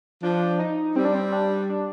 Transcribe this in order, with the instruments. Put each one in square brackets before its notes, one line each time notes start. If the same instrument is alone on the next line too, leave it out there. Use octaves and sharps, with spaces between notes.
[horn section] F3 [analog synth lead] D4
[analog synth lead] D#4
[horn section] G3 [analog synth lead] C4
[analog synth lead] D4
C4
D4
D4